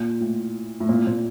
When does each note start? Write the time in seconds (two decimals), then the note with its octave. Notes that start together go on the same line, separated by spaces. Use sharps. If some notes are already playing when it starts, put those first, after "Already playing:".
Already playing: A#2
0.21 A2
0.80 A2
0.89 A#2
1.07 A#2